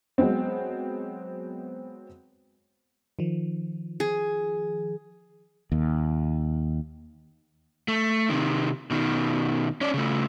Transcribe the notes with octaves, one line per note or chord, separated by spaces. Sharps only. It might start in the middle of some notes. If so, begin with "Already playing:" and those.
F#3 G#3 B3 C4
D#3 F3
G#4
D#2
A3
C3 D#3
B2 D#3
C#4 D5
C#3 A3